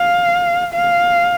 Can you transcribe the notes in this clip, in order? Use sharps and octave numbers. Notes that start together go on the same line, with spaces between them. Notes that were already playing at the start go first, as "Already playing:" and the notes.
Already playing: F5
F5